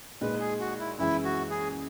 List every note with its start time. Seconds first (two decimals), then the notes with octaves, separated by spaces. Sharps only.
0.21 A#2 G#3 D#4 B4
0.40 G#4
0.60 F#4
0.79 E4
0.99 F#2 E3 G#3 E4
1.25 F#4
1.50 G#4